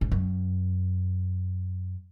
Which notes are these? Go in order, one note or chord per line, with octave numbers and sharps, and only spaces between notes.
G#2
F#2